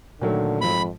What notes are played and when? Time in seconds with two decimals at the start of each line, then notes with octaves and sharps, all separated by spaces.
0.21 A#2 D3 D#3 F#3 A3
0.61 F2 G#2 F3 B5